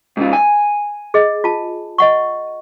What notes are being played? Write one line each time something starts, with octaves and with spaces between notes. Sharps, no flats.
G#2 C#3 F4
G#5
G#4 D#5
F4 A5
D#5 F#5 C#6